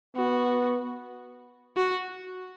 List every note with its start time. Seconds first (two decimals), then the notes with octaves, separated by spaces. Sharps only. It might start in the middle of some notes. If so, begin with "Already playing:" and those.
0.16 B3 F#4
1.77 F#4